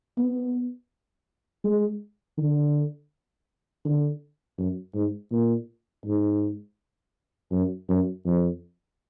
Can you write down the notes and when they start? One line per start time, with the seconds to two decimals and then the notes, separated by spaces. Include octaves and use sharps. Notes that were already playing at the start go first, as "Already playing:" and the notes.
0.18 B3
1.65 G#3
2.38 D3
3.85 D3
4.58 F#2
4.95 G#2
5.32 A#2
6.05 G#2
7.52 F#2
7.89 F#2
8.26 F2